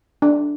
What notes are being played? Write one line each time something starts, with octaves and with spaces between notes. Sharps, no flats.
D4